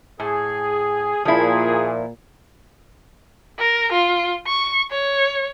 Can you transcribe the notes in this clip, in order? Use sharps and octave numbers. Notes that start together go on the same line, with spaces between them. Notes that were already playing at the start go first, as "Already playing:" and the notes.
A2 G#4
A#2 F3 E4 G#4
A#4
F4
C#6
C#5